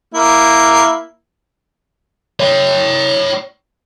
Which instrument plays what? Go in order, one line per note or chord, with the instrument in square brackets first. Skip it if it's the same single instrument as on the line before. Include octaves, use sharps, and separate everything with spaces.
[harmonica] A#3 E4
[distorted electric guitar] C#5 G5